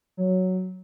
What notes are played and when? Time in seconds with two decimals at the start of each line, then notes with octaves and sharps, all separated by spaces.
0.17 F#3